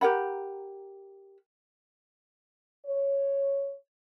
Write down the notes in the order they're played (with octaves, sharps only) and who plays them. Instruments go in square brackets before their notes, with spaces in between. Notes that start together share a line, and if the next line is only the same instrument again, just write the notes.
[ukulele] G4 A#4 F#5 B5
[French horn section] C#5